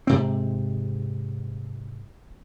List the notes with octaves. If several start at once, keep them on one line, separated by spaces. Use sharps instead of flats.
G#2 C3 C4